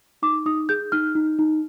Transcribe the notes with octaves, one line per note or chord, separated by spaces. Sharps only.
D#4 D6
D#4 D#6
G#4 G6
D#4 F6
D#4
D#4